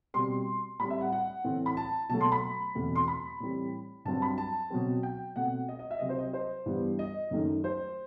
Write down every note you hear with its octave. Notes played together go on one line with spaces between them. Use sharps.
B2 G3 C4 C6
A2 G3 C4 B5
E5
F#5
F#5
A2 E3 A3 C4
B5
A5
B2 F#3 A3 A5
C6
B5
E2 B2 A3 C4
C6
B5
A2 E3 G3 C4
G2 F#3 C4 A5
B5
A5
B2 F#3 C4
G5
B2 A3 C4 F#5
D#5
D#5
E5
C3 F#3 C4 D#5
C5
D#5
C5
G2 E3 G3 B3
D#5
F#2 D#3 A3
C5